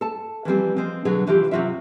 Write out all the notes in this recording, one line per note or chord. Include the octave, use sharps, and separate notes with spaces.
A4 A5
E3 F3 G3 C4
F3 G#3 C4
B2 D3 F#3 G#4
C3 E3 F3 F4 G4
C3 E3 F#3 F4 E5